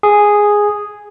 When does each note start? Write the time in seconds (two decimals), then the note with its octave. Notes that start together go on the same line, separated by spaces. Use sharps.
0.03 G#4